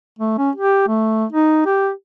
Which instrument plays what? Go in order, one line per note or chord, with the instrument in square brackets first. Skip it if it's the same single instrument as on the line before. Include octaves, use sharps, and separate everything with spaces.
[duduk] A3
C#4
G4
A3
D#4
G4